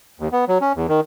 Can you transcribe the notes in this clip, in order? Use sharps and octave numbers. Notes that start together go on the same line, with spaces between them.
D#2
B3
F#3
C#4
E2
D#3